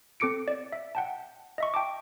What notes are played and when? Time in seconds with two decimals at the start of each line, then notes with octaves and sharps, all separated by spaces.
0.20 C4 A4 D6 C#7 D7
0.48 D5
0.72 E5
0.95 F#5 G5 A5
1.58 D#5 E5 C#6
1.74 G5 A5 D6